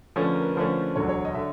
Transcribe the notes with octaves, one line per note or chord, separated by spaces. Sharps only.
D3 F3 A3 C#4 B4
A#4
B4
D3 F3 A3 C#4 C5
E1 D2 D3 F#3 C#5
C#5
D#5
D3 E5